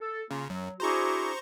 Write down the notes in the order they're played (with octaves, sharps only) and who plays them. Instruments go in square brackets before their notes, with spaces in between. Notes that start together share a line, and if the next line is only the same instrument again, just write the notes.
[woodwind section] A4
[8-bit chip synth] C#3 [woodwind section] A#3 F4 A#5
[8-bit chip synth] F#2 [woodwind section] F#3
[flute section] D4 E4 G#4 [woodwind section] F#4 [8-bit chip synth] C5 A#5 C#6